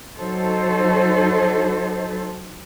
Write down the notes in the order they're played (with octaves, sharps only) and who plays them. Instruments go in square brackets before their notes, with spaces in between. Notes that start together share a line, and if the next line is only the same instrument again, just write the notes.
[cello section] F#3 D#4 A4 C5